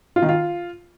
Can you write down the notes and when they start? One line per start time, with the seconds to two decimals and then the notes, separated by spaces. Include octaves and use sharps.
0.16 F4
0.22 D#3
0.29 F4